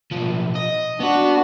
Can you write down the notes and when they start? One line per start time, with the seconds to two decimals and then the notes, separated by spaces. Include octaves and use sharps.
0.12 B1 F3
0.55 D#5
1.00 B3 D4 F#4 F#5